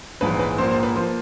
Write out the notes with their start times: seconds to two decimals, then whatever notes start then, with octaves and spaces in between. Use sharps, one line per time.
0.21 A#1 G#2 E3 B4
0.39 B4
0.58 A#1 G#2 F3 A#3 C5
0.71 C5
0.83 B4
0.96 F3 A#3 C5